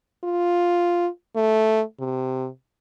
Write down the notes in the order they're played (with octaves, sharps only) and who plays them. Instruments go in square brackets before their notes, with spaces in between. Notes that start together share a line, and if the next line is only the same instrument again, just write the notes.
[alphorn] F4
A3
C3